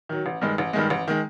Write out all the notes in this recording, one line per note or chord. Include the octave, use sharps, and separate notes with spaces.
D#3 F#3
A1
G2 D#3 G#3
A1
G2 D#3 G#3
A1
D#3 G#3